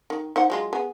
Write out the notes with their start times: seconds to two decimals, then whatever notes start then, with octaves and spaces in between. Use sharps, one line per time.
0.10 D#3
0.36 D#4 C5 F#5
0.50 F#3 G#3 F4
0.73 B3 G#4